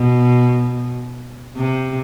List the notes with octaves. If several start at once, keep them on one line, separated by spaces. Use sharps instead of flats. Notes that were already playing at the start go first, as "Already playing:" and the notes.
Already playing: B2
C3